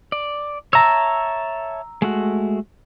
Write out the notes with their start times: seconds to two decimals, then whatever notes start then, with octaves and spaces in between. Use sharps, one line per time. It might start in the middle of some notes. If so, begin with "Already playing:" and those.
0.12 D5
0.73 C#5 E5 A5 A#5 E6
2.02 G#3 A3 F#4